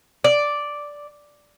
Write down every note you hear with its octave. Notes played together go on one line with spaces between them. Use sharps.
D5